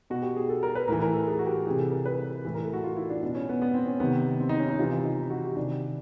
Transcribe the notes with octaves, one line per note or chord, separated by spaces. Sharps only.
B2 F#4
G4
G#4
A4
A#4
B4
A2 E3 A#4
A#4
A4
G#4
F#4
G4
C3 E3 G#4
A4
A#4
B4
A2 E3
A#4
A4
F#4
F4
E4
D4
B2 D4
C#4
B3
B3
C4
C#4
C3 D#3 B3
C4
D#4
C#4
D#4
C3 E3 F4
E4
D#4
F#4
G4
C3 D#3 D4